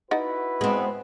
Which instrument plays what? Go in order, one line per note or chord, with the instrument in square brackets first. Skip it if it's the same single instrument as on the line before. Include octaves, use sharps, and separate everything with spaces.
[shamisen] D#4 D5 F#5 [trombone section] E4 F#4 B4
[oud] G#3 C4 [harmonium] B3